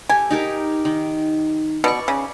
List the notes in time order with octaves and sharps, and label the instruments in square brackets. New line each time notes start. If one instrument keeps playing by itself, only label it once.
[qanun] G4 A4 [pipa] G#5
[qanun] D#4 G4 A#4
D#3
[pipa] B2 [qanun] D5 C#6
[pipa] C#3